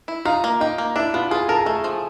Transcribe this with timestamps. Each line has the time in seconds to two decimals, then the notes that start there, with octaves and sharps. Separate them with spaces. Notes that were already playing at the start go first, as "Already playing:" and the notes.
0.08 E4
0.25 D#4 F4 F5
0.44 A#3
0.60 D#4 G4 D#5
0.78 A#3
0.96 D4 E4 E5
1.14 B3 F4 F5
1.31 F4 G#4 G#5
1.48 A4 A#4 A5
1.59 G#5
1.66 A3 A4 A5
1.84 F3